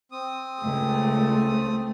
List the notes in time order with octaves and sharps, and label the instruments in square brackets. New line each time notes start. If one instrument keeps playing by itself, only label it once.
[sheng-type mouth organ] C4 D#6
[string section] C#2 [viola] A3